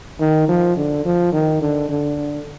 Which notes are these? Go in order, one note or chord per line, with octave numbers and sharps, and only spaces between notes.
D#3
F3
D3
F3
D#3
D3
D3